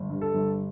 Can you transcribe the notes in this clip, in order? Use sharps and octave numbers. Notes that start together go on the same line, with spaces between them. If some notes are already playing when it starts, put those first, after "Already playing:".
Already playing: G1
G2
A4
G1